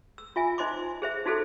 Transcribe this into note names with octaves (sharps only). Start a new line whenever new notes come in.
E6
F4 E5 G#5
D#4 C5 D#5 C6 D6
G#4 C5 E5
D#4 F#4 G#4 A4 C5